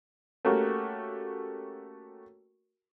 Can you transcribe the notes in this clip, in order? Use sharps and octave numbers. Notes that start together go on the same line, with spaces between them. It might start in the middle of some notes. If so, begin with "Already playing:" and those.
A3 A#3 C#4 F#4 G4 A#4